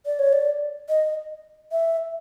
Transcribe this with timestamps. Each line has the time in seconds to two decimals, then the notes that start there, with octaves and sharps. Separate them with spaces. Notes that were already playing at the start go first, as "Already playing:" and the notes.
0.06 D5
0.19 C#5
0.33 D5
0.89 D#5
1.72 E5